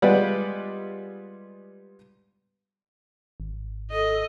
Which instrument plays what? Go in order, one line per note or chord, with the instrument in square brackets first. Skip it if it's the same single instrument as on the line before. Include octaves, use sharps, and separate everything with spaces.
[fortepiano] G3 G#3 B3 F4 B4 D5
[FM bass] G#1
[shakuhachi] A4 [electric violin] D#5